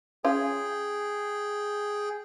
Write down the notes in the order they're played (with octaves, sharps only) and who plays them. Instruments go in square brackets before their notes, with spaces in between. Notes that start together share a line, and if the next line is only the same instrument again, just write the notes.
[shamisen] C#4 F4 [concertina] G#4 G5